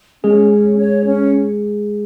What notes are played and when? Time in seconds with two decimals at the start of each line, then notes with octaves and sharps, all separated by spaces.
0.24 G#3 C#4 G#4
0.51 C#4
0.78 C#5
1.05 C#4